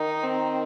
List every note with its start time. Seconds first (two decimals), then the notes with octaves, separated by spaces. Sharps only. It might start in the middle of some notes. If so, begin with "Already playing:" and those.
Already playing: D#3 D#4
0.24 C4